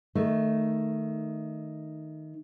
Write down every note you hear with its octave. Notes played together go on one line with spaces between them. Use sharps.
D#3 A3